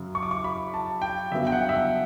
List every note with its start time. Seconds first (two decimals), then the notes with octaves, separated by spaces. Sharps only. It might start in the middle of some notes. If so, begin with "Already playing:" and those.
Already playing: F#2 C#3 F#3
0.15 C#6
0.23 D6
0.31 C#6
0.44 B5
0.74 A5
1.02 G5
1.31 G1 F#2 C#3 F#3 B3 E5
1.47 G5
1.52 F#5
1.69 E5
1.75 F#5